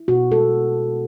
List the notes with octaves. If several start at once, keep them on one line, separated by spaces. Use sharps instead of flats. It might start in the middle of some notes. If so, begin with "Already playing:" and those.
Already playing: E4
B2 F#4
G#3 A4